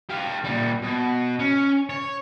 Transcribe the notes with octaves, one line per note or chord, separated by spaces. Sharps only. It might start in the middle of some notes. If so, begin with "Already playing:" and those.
G4 F5
A#2 G3
B2
C#4
C#5